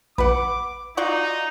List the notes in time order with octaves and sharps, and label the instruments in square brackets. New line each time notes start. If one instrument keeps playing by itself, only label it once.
[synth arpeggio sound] A#1 [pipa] B4 F#5 [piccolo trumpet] D6
[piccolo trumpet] D#4 [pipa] F4 F#4 D5